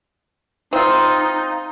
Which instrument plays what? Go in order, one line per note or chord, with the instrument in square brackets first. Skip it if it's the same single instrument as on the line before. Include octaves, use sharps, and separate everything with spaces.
[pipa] C4 F4 [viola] D#4